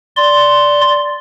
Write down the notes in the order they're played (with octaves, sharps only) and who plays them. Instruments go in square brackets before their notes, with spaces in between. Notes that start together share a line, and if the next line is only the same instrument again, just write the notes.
[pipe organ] D5 C6